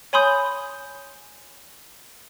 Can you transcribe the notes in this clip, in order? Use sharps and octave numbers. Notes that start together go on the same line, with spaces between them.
C#5 G#5 B5 C6 D#6 G6